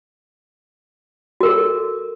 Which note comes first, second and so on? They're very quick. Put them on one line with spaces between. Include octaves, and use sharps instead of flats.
F#4 A#4 A4